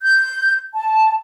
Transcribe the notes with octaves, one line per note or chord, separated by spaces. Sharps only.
G6
A5